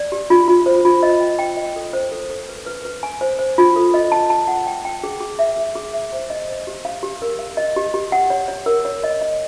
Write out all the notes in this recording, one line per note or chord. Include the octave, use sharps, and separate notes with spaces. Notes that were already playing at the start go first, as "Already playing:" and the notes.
Already playing: D5
G4
F4
F4
C5
F4
D#5
G5
G5
D#5
A4
C5
A4
A4
B4
B4
B4
G#5
C5
C5
F4
A4
D#5
A5
A5
F#5
G5
G5
G#4
G#4
E5
G#4
G#4
E5
C5
D#5
C5
G4
F5
G4
A#4
F5
D#5
G4
G4
F#5
C#5
C#5
A#4
C#5
D#5
D#5